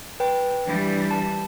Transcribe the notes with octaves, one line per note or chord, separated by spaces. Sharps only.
B4 G5
E3 G3 D4
A5